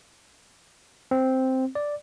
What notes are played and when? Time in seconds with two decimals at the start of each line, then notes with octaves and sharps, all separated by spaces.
1.11 C4
1.75 D5